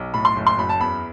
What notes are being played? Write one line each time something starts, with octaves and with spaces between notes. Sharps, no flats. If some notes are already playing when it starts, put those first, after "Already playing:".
Already playing: B1
A2 B5
C6
F#1
C6
F#2 B5
A5
E2 B5